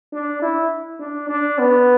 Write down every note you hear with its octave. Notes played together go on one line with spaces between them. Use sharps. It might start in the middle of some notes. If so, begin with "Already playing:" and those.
D4
E4
D4
D4
B3